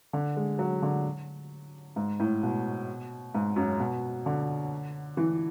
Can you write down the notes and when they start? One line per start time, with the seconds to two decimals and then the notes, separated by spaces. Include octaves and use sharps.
0.13 D3
0.37 G#3
0.59 F#3
0.82 D3
1.96 G#2
2.20 A2
2.43 B2
3.35 G#2
3.56 F#2
3.80 B2
4.26 D3
5.17 E3